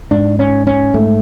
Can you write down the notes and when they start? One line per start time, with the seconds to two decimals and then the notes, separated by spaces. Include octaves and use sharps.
0.11 G#2 D4
0.39 C#4
0.67 C#4
0.94 G#2 A3